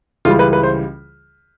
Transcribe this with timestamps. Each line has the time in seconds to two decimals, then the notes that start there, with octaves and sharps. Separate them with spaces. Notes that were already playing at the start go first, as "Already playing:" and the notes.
0.25 C#2 C#3 E3 G3 F4
0.39 B4
0.53 B4
0.63 C5